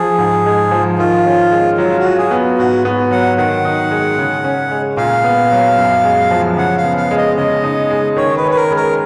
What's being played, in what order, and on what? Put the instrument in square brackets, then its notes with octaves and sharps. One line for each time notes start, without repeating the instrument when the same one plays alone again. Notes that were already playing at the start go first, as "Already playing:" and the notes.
Already playing: [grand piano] F3 [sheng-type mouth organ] G#4
[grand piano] G#2
G#3
F3
[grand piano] D#3 [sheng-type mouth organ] F4
[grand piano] C#4
G#3
[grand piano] F#3 [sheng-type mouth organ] F4
[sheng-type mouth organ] F#4
[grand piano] F4
[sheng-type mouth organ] G#4
[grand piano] B3
[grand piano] G#2 [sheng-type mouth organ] F#4
[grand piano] B3
[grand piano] F#3 [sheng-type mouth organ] F#5
[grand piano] D#3 [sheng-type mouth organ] F#5
[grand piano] D#4
G#3
C#3
C#4
G#3
[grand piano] A#2 [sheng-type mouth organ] F5
[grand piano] B3
F#3
F#2
G#3
F3
[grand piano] C#3 [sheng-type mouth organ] F#5
[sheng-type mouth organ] F5
[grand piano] B3
[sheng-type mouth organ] F5
[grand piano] G#3
[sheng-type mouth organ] D#5
[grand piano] C#3 [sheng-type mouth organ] D#5
[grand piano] D#4
G#3
[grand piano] D#3 [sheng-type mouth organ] C#5
[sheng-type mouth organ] B4
[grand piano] C#4
[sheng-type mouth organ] B4
A#4
[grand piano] G#3
[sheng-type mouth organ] A#4